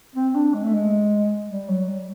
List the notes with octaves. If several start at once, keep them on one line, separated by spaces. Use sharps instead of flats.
C4
D4
G#3
A3
G#3
G3
F#3
G3